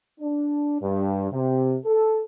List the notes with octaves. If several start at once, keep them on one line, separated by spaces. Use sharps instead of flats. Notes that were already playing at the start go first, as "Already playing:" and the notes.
D4
G2
C3
A4